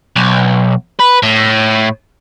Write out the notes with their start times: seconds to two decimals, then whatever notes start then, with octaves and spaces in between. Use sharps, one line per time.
0.16 B1
1.00 B4
1.23 A2